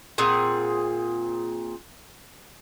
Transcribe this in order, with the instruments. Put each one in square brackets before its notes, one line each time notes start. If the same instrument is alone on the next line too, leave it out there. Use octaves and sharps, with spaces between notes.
[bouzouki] A#2 C4 G#4 F#5